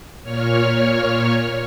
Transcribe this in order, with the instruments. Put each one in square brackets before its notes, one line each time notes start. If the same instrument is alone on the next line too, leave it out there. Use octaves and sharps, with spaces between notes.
[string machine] A#2 C#5 F6